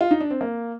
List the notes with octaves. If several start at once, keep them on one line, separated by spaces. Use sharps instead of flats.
F4
D#4
D4
C4
A#3